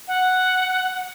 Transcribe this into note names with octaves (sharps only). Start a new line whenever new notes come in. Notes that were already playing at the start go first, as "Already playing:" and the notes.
F#5